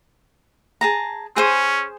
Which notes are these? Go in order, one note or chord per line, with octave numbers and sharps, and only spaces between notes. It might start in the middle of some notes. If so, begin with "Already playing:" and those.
G#4 A5 A#5
C#4 G#4 C5 D#6